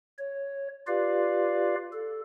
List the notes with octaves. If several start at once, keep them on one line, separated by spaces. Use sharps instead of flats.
C#5
F4 G4 B4 D5 F5
A4